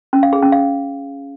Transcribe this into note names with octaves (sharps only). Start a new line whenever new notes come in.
C#4
F5
G#4
C#4
F5